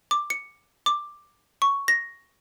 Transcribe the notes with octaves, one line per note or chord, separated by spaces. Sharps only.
D6
C#7
D6
C#6
A#6